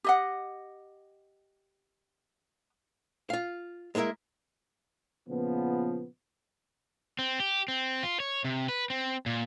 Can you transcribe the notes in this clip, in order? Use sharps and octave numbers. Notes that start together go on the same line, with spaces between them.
G4 D#5 F#5
F4 F5
G#3 A#3 E4 A#4 E5
A#2 C#3 F3 B3
C4
G4
C4
F4
C#5
C3
B4
C4
A#2